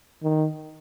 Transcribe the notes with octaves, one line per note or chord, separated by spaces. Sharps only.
D#3